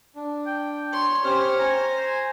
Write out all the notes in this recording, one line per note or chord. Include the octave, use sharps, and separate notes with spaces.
D4
G5
C#5 C6
C#4 G4 C5 F6
G#5 A#5
C5